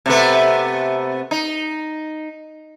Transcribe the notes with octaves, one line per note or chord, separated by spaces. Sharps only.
C3 A3 B3
D#4